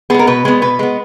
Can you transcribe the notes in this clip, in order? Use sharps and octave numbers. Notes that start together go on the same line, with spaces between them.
G#3 B3 G#4 A#4
B2 B4
G#3 B3
B2 B4
G#3 B3